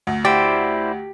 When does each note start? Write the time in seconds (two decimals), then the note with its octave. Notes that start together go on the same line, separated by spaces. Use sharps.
0.07 D2
0.25 E4 G4 C5 D5